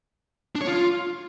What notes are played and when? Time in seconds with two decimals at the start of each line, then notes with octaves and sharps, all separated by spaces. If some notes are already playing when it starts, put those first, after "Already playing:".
0.55 D4
0.61 C#5
0.67 F4